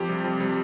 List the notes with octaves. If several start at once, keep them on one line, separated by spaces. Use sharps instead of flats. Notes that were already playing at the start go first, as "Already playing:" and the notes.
Already playing: F2 G4
C3 G3
F2
C3 G3